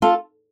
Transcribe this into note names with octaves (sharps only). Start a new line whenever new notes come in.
F4 A4